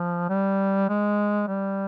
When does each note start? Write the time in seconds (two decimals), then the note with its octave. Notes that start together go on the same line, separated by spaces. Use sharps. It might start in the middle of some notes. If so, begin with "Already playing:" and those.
Already playing: F3
0.29 G3
0.89 G#3
1.47 G3